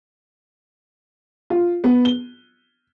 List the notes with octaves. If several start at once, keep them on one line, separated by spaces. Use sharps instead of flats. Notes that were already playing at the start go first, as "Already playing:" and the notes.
F4
B3
G7